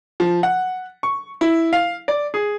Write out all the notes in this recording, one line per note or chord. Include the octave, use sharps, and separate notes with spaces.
F3
F#5
C#6
E4
F5
D5
G#4